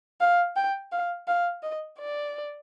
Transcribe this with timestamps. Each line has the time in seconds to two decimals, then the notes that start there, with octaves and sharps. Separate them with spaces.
0.21 F5
0.56 G5
0.92 F5
1.28 F5
1.63 D#5
1.99 D5